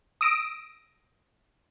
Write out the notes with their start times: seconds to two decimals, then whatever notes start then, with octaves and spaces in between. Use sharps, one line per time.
0.21 D#6 E6 A#6 D7